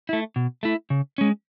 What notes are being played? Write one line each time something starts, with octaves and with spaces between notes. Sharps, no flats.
A3 E4
B2
A3 E4
C#3
G#3 C#4